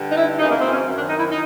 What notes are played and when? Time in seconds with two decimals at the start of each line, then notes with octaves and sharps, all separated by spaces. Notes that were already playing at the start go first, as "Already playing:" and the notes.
Already playing: G2 D3
0.09 D#4
0.15 E4
0.38 F#2 C#3 E3 D#4
0.50 A#3
0.61 C4
0.72 C#4
0.85 F#2 D#3
0.97 D4
1.08 D#4
1.19 E4
1.30 D#4